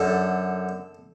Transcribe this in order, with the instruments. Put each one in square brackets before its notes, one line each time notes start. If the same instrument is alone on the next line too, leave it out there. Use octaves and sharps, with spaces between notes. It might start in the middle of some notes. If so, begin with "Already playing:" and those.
Already playing: [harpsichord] F#2 D3 A4